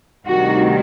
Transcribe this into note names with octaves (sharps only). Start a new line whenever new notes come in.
D2 C3 D#3 G3 F#4